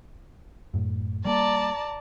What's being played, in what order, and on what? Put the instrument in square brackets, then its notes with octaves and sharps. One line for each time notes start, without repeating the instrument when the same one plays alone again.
[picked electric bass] F#2 A2
[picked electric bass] G3 A3 A#3 [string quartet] D5 A5 A#5